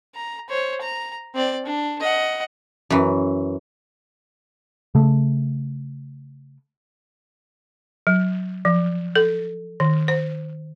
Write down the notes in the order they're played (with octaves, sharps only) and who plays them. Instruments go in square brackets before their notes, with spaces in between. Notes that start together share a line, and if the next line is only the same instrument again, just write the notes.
[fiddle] A#5
C5 C#5
A#5
C4 D5
D4
D#5 F#5
[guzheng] F#2 E3
[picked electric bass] C#3 A3
[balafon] F#3
F3
A4
D#3
C5